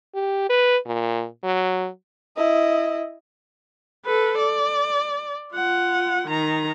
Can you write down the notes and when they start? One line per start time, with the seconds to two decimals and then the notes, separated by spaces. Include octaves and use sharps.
0.15 G4
0.50 B4
0.86 A#2
1.44 F#3
2.37 E4 D#5
4.05 A4 B4
4.38 D5
5.54 F4 F#5
6.28 D#3 A#5